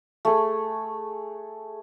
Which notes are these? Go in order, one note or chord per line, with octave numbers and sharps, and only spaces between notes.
A3 G#4